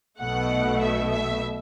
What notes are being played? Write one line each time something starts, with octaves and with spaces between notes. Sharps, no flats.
B1 B2 A3 F#5
E5
E5